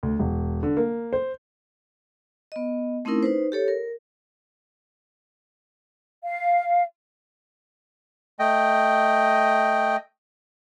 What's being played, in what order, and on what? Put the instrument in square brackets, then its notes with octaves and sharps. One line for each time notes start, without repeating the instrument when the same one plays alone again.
[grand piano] D2
E1
D3
A#3
C5
[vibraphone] B3 D#5
A3 C4 C#4 D#4 E4 A#4
D#4 B4 C5
G4 A4 C#5
A#4
[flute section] F5
[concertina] A3 D#5 G5